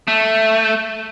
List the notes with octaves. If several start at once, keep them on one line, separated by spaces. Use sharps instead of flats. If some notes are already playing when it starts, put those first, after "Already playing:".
A3